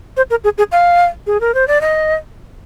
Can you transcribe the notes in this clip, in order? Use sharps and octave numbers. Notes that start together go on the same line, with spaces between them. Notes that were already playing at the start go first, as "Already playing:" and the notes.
C5
A#4
G#4
G#4
F5
G#4
A#4
C5
D5
D#5